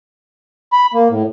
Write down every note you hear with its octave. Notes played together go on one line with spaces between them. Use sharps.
B5
A#3
A2